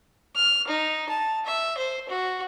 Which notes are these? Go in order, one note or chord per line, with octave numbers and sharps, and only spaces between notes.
F6
D#4
A5
E5
C5
F#4